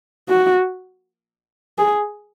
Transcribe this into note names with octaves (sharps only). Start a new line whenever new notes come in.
F#4
G#4